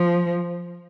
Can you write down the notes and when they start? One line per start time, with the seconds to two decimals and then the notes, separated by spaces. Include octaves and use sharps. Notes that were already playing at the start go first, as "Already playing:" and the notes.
Already playing: F3